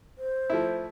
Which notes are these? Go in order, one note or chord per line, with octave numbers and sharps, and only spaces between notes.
C5
F3 A3 E4